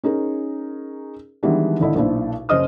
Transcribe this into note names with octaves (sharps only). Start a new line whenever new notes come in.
C#4 D#4 G#4 A#4
D#3 E3 G3 G#3 B3 D4
G#1 D3 E4 D#5
B1 A#2 D4 E4 C5
F#1 C#4 C5 D#5 D#6 F6